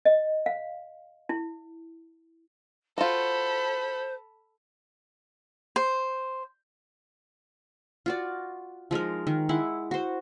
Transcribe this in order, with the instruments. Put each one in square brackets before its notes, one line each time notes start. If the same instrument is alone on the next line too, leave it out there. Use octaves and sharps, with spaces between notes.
[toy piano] D#5
F5
E4
[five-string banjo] F4 F#4 [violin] A4 B5 [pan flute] C5
[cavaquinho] C5
[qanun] F4 F#4 D5
F3 G#3 D#4 A#4
D#3
G#3 E4 F#5
F#4 C5